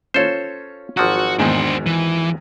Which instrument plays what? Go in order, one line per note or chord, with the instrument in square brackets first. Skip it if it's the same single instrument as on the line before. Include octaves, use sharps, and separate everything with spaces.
[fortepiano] C#4 F4 C#5 [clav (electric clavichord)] A4 C5
[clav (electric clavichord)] G#1 F3 F#3 [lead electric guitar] F#4
[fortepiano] E2 G#2 D#3 [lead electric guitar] D4 C5
[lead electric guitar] E3